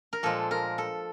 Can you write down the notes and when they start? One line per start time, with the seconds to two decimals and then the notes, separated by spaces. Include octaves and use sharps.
0.13 A#4
0.23 A#2 F3 G#3 A4
0.51 A#4
0.78 A4